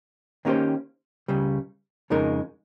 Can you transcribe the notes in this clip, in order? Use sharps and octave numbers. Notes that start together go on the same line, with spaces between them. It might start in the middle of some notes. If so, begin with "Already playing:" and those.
D#3 A#3 C#4 G4 C5
C#2 C#3 G3
F2 C#3 G#3 D#4 A#4